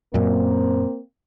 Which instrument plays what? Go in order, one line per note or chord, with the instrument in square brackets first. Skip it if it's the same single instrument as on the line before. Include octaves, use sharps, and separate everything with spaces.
[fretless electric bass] F#2 A#2 [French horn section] A#3 C4